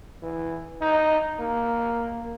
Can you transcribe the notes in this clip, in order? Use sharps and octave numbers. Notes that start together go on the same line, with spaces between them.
E3
D#4
A#3